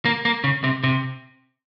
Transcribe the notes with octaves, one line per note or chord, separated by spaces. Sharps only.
A#3
A#3
C#3
C3
C3